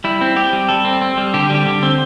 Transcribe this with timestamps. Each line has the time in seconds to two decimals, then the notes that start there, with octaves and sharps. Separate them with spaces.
0.04 G3 E4
0.21 C4
0.36 C4 G4
0.53 G3
0.69 G3 A4
0.85 C4
1.02 C4
1.17 G3
1.34 D3 G4
1.50 G3 G4
1.66 D3
1.83 C4